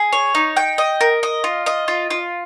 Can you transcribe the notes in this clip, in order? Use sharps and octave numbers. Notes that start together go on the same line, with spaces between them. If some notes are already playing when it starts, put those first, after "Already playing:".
Already playing: G#4
C#5
D#4
G5
D#5
A#4
D#5
F4
D#5
F4
F4